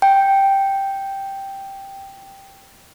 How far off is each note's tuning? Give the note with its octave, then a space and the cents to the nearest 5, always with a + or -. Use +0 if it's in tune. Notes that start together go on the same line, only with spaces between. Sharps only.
G5 +0